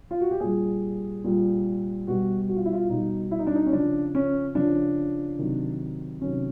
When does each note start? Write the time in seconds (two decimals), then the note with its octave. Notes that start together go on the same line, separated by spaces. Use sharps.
0.11 F4
0.21 F#4
0.31 G4
0.40 A#2 G3 G#4
1.24 A#2 G3
2.07 B2 G3 F#4
2.49 F#4
2.56 F4
2.65 E4
2.73 F4
2.89 B2 G3 D#4
3.31 E4
3.39 D#4
3.47 D4
3.55 D#4
3.66 C#4
3.73 C#3 F3 D4
4.15 C#4
4.55 C#3 F3 D4
5.39 C3 D#3 F#3
6.21 C3 D#3 F#3 C#4